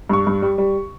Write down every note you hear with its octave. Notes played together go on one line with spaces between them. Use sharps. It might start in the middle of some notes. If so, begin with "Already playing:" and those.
G2 C#6
G2
G3
G3